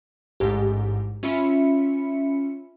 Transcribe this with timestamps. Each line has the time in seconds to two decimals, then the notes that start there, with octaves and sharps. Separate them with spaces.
0.40 A1 G#2 G4
1.23 C#4 F4 E5 B5 C#7